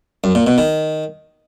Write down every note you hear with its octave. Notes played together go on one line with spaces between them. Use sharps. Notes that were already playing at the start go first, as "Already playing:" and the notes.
F#2
A#2
B2
D#3